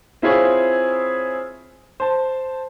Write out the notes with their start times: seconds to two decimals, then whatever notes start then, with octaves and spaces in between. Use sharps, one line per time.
0.22 C4 E4 F4 G#4 C#5
2.00 C5 A5